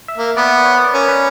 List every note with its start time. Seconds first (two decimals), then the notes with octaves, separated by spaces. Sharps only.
0.08 E5
0.18 A#3
0.37 B3 D5
0.65 C#5
0.75 B4
0.84 D5
0.94 C#4 A#4
1.09 B4